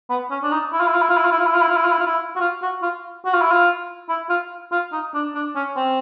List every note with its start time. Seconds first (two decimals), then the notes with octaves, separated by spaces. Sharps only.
0.10 B3
0.31 C#4
0.43 D4
0.52 D#4
0.73 E4
0.80 F4
0.88 E4
0.95 F4
1.02 E4
1.09 F4
1.17 E4
1.24 F4
1.32 E4
1.40 F4
1.47 E4
1.55 F4
1.62 E4
1.69 F4
1.77 E4
1.85 F4
1.92 E4
1.99 F4
2.06 E4
2.36 F#4
2.40 F4
2.62 F#4
2.82 F4
3.25 F#4
3.34 F4
3.42 E4
3.51 F4
4.09 E4
4.29 F4
4.72 F4
4.92 D#4
5.14 D4
5.35 D4
5.56 C#4
5.76 C4